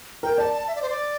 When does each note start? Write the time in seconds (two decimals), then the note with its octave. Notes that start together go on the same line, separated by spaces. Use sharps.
0.23 A#4 G5
0.38 D5 A5
0.53 A5
0.68 E5
0.75 D5
0.82 C5
0.90 D5